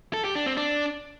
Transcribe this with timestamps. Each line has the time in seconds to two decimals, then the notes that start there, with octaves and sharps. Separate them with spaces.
0.13 A4
0.24 G4
0.35 D4
0.46 C4
0.57 D4